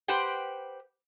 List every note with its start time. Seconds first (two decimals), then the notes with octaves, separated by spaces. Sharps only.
0.08 G4 B4 C5 F#5 G5